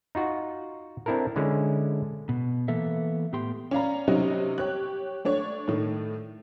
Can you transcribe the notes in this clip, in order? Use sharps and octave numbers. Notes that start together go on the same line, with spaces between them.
D#4 F4 F#4
C4 D4 E4 A4 A#4
D3 G#3 C#4 E4
B2
E3 A#3 B3 A4 E5
A2 B3 G4 G5 C6
C#4 D5 F5 A#5
C3 F#3 G3 C4 C#4 D#4
G4 C#5 F#6
A3 D4 C#5 C#6
A2 D#3